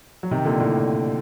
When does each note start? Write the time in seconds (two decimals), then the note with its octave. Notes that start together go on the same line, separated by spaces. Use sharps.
0.23 F#3
0.31 C3 D#3
0.45 A#2 D3
0.60 A2 C3